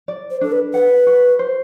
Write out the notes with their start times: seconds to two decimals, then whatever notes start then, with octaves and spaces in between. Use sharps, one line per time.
0.08 D5
0.30 C5
0.41 D4 A4
0.52 B4
0.74 B4 F#5
1.07 F#4
1.39 C5